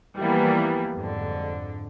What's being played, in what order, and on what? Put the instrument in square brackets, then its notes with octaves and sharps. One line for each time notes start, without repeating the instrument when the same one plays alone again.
[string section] E3 F3 G3 A#3 B3
F2 G#2 D3